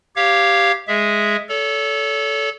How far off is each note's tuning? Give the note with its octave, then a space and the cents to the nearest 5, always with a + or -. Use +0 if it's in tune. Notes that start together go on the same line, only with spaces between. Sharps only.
G4 +0 C#5 +0 F5 -5
G#3 +0 G#4 +0 E5 +0
A4 -10 C#5 +40